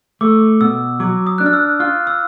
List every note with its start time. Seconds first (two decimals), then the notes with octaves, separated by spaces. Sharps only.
0.21 A3 D6
0.61 B2 E6
1.00 F#3 D6
1.27 D#6
1.38 D4 F#6
1.46 F6
1.53 E6
1.80 F4 F6
2.07 E6